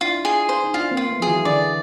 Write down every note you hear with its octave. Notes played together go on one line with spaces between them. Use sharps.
D4 E4 F4
G#4
C5
D#4
D4 E4 F4
A#3 C4
F4
A3 B3
F3 G#4
E3 F#3
D3 E3 D5